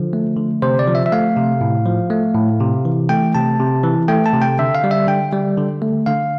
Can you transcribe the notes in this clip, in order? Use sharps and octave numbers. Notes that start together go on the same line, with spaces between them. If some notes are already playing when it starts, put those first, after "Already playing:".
Already playing: D3 F3
A3
D3
C3 C5
D5
F3
E5
E5
A3 F5
C3
A2
F3
A3
A2
C3
E3
A3 G5
C3 A5
C3
E3
A3 G5
A5
C3
G5
D3 E5
F5
G3
E5
D3 G5
G3
D3
A3
D3 F5